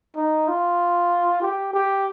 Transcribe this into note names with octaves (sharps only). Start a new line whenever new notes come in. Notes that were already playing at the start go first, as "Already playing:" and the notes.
D#4
F4
G4
G4